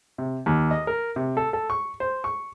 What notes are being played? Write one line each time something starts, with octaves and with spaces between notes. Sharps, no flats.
C3
D#2
D#5
A#4
C3
A4
A4
C#6
C5
C#6